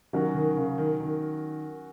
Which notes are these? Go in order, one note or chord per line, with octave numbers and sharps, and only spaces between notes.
D#3 F#3 C#4 F#4 A#4
D#3
C#3
D#3
D#3